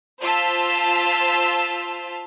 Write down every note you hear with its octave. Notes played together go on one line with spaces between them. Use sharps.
F4 C5 A5 E6 B6